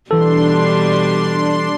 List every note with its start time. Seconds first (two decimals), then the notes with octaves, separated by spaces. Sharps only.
0.11 B2 E3 G3 D4 A4 C6